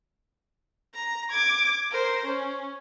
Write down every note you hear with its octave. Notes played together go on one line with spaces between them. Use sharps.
A#5
D6 G#6
A#4 C5
C#4